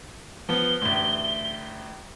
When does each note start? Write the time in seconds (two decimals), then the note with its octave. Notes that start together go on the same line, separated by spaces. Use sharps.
0.49 F3 B3 G7
0.81 A1 D2